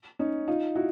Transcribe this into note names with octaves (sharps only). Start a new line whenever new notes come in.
C#4 D#4
D#4 F4
E4 F#4